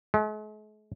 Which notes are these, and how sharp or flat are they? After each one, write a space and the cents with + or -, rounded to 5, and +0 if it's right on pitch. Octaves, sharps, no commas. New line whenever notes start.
G#3 +45